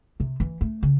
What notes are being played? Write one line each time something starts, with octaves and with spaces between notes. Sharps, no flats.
C3
E3
A3
C#3